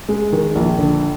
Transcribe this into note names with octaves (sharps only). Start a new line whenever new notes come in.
G#3
D#3
A#1
D3